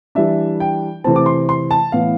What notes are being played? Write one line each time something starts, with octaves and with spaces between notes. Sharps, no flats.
E3 G3 D4 E5
G5
C3 E3 A3 C4 A5
D6
C6
C6
A5
A2 E3 B3 F5